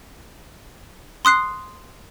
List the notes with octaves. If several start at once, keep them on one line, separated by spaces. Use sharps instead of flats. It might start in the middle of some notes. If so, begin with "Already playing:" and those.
C6 D#6 F#6 C7